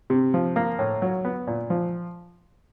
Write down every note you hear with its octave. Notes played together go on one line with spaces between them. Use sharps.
C3
F3
A#3
A2
F#3
B3
A#2
F3